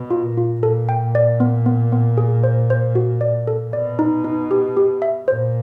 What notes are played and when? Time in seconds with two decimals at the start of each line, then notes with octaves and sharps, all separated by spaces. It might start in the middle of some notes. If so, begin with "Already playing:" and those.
Already playing: B2
0.11 F4
0.24 A#2
0.37 F4
0.62 A#2 A4
0.89 G5
1.15 D5
1.40 B3
1.66 B3
1.92 B3
2.18 G#4
2.44 C5
2.70 C5
2.95 F#4
3.21 D5
3.47 A4
3.73 B2 D5
3.99 D#4
4.24 D#4
4.51 G4
4.77 G4
5.02 E5
5.28 A#2 C5